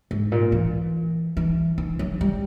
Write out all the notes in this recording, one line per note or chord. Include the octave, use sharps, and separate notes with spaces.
G#2
A#2
E3
E3
E3
F#3
G3